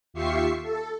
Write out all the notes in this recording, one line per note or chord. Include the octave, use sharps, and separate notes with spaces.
D#2 F4 G4 E5 C#6 C7
A4